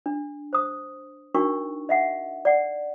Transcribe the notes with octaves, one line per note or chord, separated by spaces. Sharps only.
D4
C5 D#6
D4 D#4 F#4 A#4 G5 C#6
D#5 E5 F#5
D5 F#5